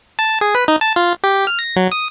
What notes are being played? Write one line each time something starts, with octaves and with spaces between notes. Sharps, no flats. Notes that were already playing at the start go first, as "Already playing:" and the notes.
A5
G#4
B4
D#4
A5
F4
G4
F6
A#6
F#3
D#6